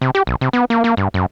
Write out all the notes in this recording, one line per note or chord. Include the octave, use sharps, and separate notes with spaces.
C3
G4
B1
C3
B3
A#3
A#3
G2
F#2